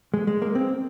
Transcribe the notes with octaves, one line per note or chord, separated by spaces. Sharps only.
G#3
G#3
A#3
C4